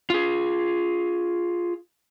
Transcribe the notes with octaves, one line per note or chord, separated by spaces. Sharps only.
F4 G#4